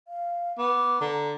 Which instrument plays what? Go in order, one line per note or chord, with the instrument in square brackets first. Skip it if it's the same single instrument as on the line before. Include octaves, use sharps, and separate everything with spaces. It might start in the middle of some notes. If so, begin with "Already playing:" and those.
[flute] F5
[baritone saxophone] B3 [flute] D6
[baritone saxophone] D3 [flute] A#5